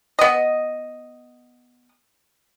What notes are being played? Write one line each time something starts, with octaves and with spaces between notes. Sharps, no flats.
B3 D#5